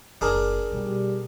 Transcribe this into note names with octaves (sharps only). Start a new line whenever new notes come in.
F#1 D4 G#4 A#4
B2 G3